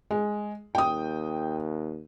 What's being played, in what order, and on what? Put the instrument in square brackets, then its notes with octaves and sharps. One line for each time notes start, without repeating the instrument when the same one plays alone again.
[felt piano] G#3
[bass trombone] D#2 [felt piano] G5 D#6